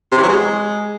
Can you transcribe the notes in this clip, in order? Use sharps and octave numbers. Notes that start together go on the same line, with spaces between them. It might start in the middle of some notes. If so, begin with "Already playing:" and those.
C3
E3
F#3
G#3